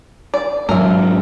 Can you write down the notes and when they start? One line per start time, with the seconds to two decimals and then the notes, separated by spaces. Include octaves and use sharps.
0.34 D5
0.69 G#2 F#3 A#4 E5